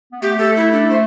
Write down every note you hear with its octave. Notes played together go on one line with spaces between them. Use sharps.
B3
A3 G4
A4
E4
D4
A3 C5